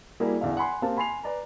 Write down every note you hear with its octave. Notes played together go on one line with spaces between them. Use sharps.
G3 A#3 E4 F#4 G#4
E2 D3 E5 F5
F#5 G#5 B5 C6
A#3 C4 G4 F5 A5
G#5 B5 C6 C7 F7
B4 D5 A#5